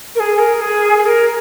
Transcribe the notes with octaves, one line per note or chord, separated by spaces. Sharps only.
A#4
G#4
A#4
G#4
G#4
A#4